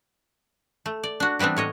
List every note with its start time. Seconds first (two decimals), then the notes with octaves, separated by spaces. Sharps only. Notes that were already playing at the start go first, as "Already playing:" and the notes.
0.86 A3
1.03 D5
1.20 D4 F#4
1.39 E3 G3 B3 C4 D4
1.56 A2 C#5 D#5